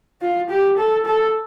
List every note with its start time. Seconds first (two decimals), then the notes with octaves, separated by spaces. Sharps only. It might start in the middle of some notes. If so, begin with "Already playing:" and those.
0.21 F4
0.49 G4
0.77 A4
1.06 A4